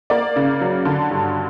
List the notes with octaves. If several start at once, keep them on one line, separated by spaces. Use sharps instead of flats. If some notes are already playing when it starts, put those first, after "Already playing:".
A#3 D5
C#3
F#3
D3
G2